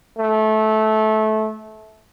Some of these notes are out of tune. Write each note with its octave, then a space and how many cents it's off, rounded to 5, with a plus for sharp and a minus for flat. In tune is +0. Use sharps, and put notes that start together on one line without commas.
A3 -20